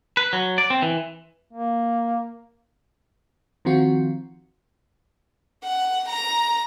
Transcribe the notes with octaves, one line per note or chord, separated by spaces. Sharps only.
B4
F#3
D5
C4
E3
A#3
D#3 F3 C4 F4 F#4
F#5
A#5